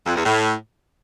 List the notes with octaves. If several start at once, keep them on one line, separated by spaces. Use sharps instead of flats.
F2
E2
A2